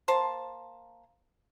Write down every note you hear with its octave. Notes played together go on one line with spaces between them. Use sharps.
A#3 C5 A5